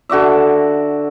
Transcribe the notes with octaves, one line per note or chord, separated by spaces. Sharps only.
D3 F#4 D5 E5